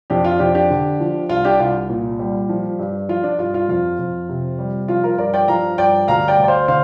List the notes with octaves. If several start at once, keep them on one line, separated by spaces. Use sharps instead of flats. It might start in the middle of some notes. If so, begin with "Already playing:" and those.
F2 D4 G4
F4
F2 D4 G4
D4 G4
D3
F3
C2 F4
D4 G4
C2 F4
A#2
G3
F3
G2
F3 F4
D4
G2 F4
F4
F2 F4
F2
C3
G3
F3 F4
F4 A#4
G2 A#4 D5
D5 G5
F3 F5 A#5
G2 D5 G5
D2 F5 A#5
D5 G5
D2
D5
C5 F5
D3 C5 F5